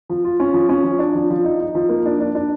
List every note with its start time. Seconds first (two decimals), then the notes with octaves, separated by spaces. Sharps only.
0.09 F3
0.24 F4
0.40 C#4
0.54 F3
0.69 C#4
0.84 F3
0.99 D4
1.15 F3
1.30 F3
1.44 D#4
1.60 D#4
1.75 F3
1.89 A#3
2.06 D4
2.21 D4
2.35 D4